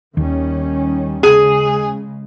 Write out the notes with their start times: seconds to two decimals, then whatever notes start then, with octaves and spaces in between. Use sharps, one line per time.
0.17 D#2 D#3 G3 C#4
1.23 C#3 G#3 G#4